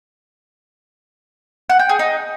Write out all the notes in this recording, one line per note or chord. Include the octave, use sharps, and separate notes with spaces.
F#5
G5
G#4
D#4